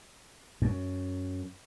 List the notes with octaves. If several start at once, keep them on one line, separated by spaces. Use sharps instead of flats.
F#2